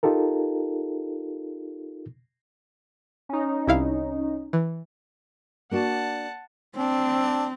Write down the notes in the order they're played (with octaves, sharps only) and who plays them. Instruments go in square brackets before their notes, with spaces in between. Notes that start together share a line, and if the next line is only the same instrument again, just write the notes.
[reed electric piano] D#4 F4 G4 A4 A#4
[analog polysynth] C#4 D#4
[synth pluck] C2 E4 F5
E3
[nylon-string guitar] A#3 D4 F#4 [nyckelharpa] F#5 A5
[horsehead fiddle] C4 [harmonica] D4